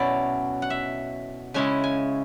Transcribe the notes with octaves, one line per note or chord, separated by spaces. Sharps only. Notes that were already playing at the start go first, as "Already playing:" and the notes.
Already playing: B2 F#3 C#4 E4 D5
F#5
E5
C#3 G#3 C#4 E4 G#5
G#5